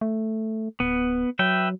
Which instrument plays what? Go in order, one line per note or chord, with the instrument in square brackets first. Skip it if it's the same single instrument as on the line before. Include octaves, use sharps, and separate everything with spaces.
[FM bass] A3
[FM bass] D1 [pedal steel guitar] B3
[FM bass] F#3 [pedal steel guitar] B4 E5 G5